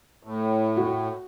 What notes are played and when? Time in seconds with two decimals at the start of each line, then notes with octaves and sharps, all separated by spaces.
0.23 A2
0.77 F#4